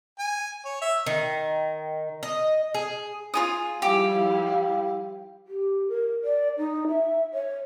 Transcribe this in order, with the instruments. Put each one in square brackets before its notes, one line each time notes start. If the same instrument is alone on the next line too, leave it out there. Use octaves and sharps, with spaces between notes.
[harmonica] G#5
C#5
E5
[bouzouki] D#3
D#5
G#4
[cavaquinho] F4 G#4 D#6 [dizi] G#5
[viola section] F3 G3 E4 [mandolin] G4 [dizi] F5
[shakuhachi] G4
A#4
D5
D#4
E5
C#5